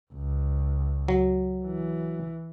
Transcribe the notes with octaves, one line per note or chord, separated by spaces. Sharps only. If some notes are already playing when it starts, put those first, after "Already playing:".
C#2
F#3
E3